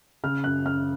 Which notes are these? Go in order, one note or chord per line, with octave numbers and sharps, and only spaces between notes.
C#3 F6
F#2 F#6
F#2 F6